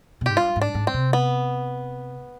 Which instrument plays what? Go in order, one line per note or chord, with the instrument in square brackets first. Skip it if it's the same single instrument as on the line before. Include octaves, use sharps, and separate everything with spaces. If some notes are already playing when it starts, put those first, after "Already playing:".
[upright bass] B2
[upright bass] G#2 [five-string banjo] G4
[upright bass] G2 [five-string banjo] F4
[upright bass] G#2
[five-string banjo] D4
[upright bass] G#2
[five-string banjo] C4
[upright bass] C3
[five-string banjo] B3